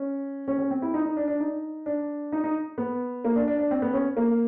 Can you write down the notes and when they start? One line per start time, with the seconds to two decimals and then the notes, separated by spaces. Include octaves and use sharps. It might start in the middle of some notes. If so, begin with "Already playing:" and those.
Already playing: C#4
0.48 C#4
0.59 C#4
0.71 C4
0.82 E4
0.94 D#4
1.05 D#4
1.17 D4
1.28 D4
1.40 D#4
1.86 D4
2.32 D#4
2.44 D#4
2.78 B3
3.24 A#3
3.36 D4
3.48 D4
3.59 D4
3.71 C4
3.82 B3
3.94 C#4
4.17 A#3